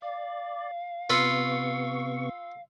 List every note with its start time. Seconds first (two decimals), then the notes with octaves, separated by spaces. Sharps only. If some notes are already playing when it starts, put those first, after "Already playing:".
0.02 D5 F5
1.10 C3 B3 F4 B4 C#6 E6 C7 C#7